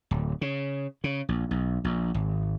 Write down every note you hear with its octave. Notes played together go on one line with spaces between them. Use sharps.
D1
C#3
C#3
A#1
B1
A#1
G#1